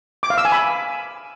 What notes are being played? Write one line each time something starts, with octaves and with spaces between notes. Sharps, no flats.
D6
F5
E6
G#5
B5